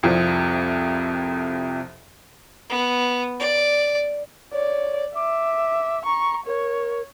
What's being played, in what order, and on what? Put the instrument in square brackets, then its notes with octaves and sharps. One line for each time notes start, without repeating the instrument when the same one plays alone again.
[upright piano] C2 F2 C3 F3
[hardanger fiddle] B3
D5
[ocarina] C#5 [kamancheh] D5
[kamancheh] E5 [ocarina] D6
[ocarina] A#5 [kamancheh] C#6
[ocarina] A#4 [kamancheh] C#5